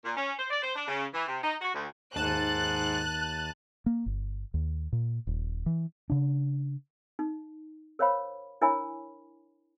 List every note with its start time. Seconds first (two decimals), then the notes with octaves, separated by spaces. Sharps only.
0.04 A#2
0.17 C#4
0.39 C5
0.51 D5
0.63 C5
0.76 D4
0.88 C#3
1.13 E3
1.28 C3
1.43 D#4
1.61 F#4
1.74 D2
2.16 D#2 G#2 A5 F#6 D#7
3.86 A#3
4.06 G1
4.54 D#2
4.93 A#2
5.27 D#1
5.66 E3
6.10 C#3 D4
7.19 D#4
7.99 A#4 C5 C#5 F5 B5
8.61 D4 E4 A#4 C#5 G#5 B5